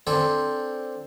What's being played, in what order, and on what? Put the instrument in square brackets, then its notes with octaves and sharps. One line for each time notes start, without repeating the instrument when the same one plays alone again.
[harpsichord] C4 D4 A4 C5 G5 G#5